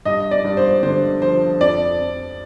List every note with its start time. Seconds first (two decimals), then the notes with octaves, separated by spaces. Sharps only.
0.05 G2 D#5
0.31 D5
0.44 G2
0.57 C5
0.82 D3 C5
1.22 F3 C5
1.60 F2 D5
1.99 F2